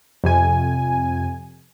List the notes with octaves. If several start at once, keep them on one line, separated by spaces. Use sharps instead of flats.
F2 C3 G#5